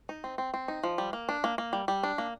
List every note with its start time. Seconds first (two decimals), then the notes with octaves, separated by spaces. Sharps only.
0.09 D#4
0.24 C4
0.38 C4
0.54 C4
0.68 D#4
0.83 F3
0.98 G3
1.13 A#3
1.29 D4
1.44 A#3
1.58 A#3
1.73 G3
1.88 G3
2.03 D4
2.18 A#3